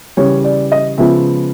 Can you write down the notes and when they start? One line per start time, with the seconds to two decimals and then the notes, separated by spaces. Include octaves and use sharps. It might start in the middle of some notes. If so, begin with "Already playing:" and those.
0.17 C#3 E3 G3 C#5
0.44 D5
0.72 D#5
0.98 C#3 F3 G#3 B3 E5